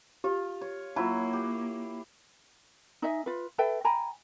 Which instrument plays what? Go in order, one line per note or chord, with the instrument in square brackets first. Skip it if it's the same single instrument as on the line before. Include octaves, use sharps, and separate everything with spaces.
[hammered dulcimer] F4 [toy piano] G4
[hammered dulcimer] C#5
[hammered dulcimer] F#3 E4 [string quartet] A#3 [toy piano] F4 A5
[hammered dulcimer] G4
[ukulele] D#4 D#5 E5 G#5
F4 B4
A4 B4 E5 G5
G5 G#5 A#5 B5